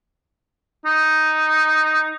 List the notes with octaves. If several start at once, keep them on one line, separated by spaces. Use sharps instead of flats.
D#4